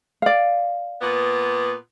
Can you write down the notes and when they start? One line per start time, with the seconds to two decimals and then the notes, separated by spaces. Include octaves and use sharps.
0.22 D5 F5
1.01 A#2 B3